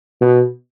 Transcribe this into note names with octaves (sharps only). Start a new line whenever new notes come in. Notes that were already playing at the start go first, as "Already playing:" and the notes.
B2